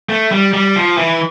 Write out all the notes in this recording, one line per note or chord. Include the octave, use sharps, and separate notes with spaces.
A3
G3
G3
F3
E3